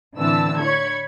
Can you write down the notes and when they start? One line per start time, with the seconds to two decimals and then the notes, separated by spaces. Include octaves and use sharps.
0.16 A2 D3 E3 C4 A5 E6
0.60 C#5 B5 C#6 G#6